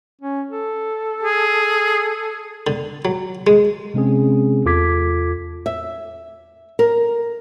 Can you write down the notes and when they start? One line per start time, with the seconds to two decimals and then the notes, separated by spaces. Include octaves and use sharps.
0.21 C#4
0.51 A4
1.23 G#4
2.67 D3
3.05 F#3
3.47 G#3
3.94 C3 G#3 C4 C#4 G#4
4.65 E2 F4 A4 D6 G#6 B6
5.66 E5
6.79 A#4